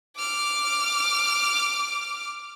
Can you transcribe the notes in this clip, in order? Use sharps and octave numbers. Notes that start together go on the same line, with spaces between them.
D6 F6